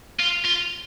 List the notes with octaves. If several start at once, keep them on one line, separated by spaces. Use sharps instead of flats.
F4
F4